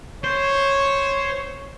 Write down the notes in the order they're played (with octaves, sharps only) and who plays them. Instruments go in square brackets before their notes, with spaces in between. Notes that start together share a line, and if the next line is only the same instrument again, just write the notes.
[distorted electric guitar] C5 [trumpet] C#5